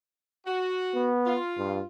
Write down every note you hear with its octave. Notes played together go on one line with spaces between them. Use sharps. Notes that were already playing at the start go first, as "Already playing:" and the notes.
F#4
B3
F4
G2